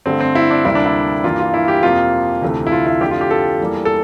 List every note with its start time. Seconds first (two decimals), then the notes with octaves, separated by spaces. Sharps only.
0.06 G2 D3 A3 C4
0.21 C4
0.35 E4
0.50 D4
0.65 D2 C3 G3 A#3 E4
0.75 D4
0.86 E4
1.24 G2 E3 A#3 F4
1.39 F4
1.54 E4
1.68 G4
1.83 F2 C3 F3 A#3 F4
2.42 D2 C3 E3 A3
2.67 E4
2.72 F4
2.87 E4
3.01 F2 D3 A3 G4
3.11 F4
3.21 G4
3.31 A4
3.60 E2 E3 G3 A#3
3.85 A4